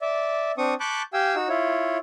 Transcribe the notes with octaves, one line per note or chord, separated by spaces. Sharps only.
D5 E5
C4 D4 C#6 D#6
A5 B5 C#6 D6 F#6 G6
G4 F5 G5 G#5 E6
D#4 F#4 E6
E4 F4 C#5